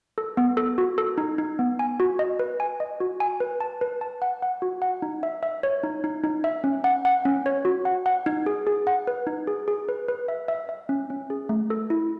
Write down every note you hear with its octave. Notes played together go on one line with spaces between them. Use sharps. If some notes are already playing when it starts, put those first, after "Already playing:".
A4
B3
A4
F#4
A4
D#4
D#4
B3
G#5
F#4
D#5
B4
G#5
D#5
F#4
G#5
B4
A5
B4
A5
F#5
F#5
F#4
F#5
D#4
E5
E5
C#5
D#4
D#4
D#4
E5
C#4
F#5
F#5
C#4
C#5
F#4
F#5
F#5
D#4
G#4
G#4
F#5
B4
D#4
G#4
G#4
B4
B4
E5
E5
E5
C#4
C#4
G#4
A3
A4
E4